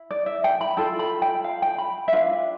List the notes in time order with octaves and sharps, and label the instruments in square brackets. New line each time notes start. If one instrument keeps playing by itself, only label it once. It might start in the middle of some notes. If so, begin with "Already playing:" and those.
Already playing: [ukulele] E4
D5
E5
G5
B5
F4 A4 G5
B5
G5
F5
G5
B5
E5
D4 F4 B4 F5